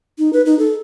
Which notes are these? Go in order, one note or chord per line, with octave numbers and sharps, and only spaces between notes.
D#4
B4
D#4
A4